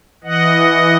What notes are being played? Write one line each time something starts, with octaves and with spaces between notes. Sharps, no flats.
E3 D#5 F#5